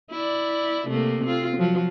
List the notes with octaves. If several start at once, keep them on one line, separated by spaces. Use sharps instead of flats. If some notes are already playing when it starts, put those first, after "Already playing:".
E4 D5
C3 A3 A#3
C4 F4
F3 F#3